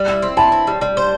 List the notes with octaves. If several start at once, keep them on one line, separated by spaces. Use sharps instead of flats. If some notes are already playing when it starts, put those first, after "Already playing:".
Already playing: G3
E4
C4
E4 A5
C4
G3
G3
C5